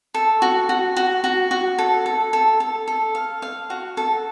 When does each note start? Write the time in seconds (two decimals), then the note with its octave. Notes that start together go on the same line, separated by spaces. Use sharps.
0.14 A4
0.42 F#4
0.69 F#4
0.97 F#4
1.24 F#4
1.51 F#4
1.78 A4
2.06 A4
2.33 A4
2.60 A4
2.88 A4
3.15 F5
3.42 F5
3.70 F#4
3.97 A4